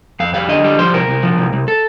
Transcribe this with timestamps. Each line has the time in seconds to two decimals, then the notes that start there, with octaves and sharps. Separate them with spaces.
0.20 F2 F5
0.34 G3 F5
0.49 D3 D#5
0.64 G3
0.79 F3 C5
0.93 C2 A#4
1.08 C2
1.23 F3
1.38 C2
1.53 C2
1.68 A4